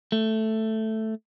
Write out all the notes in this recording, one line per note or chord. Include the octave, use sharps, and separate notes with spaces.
A3